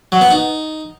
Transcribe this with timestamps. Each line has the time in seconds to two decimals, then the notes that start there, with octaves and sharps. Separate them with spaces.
0.12 F#3
0.21 B3
0.31 D#4